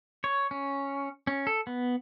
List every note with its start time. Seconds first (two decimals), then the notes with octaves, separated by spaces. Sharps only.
0.24 C#5
0.51 C#4
1.27 C#4
1.47 A4
1.67 B3